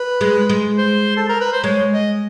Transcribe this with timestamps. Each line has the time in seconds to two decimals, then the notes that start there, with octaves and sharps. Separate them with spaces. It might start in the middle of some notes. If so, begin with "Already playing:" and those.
Already playing: B4
0.21 G#3
0.49 G#3
0.78 C5
1.17 A4
1.29 A#4
1.41 B4
1.53 C5
1.64 G#3 C#5
1.93 D#5